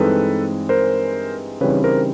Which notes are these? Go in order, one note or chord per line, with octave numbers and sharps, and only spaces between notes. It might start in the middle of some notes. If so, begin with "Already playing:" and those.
Already playing: G2 E3 G#3 C4 D#4 A4 B4
A#4 C5
C#3 E3 G3 C4 D#4 B4 C#5
A#4 C5